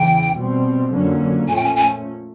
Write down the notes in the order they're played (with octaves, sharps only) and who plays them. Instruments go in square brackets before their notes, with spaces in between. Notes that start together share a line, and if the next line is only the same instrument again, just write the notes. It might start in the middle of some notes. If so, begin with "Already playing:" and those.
Already playing: [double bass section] E2 C#3 E3 [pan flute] G5
[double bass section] B2 G3 C4
F2 D3 F#3 A#3 C#4
[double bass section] A#2 F3 A3 C#4 [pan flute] G#5
[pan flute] G5
G#5
G#5